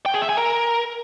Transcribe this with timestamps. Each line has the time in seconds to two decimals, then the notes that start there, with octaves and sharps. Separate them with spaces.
0.06 G5
0.14 G#4
0.22 E5
0.29 G#5
0.37 A#4